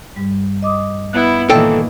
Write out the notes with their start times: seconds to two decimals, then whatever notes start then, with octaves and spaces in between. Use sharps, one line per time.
0.16 G2 G3
0.62 D#5 D6 D#6
1.13 B3 E4 F#6
1.50 A#2 D#3 E3 A4 G5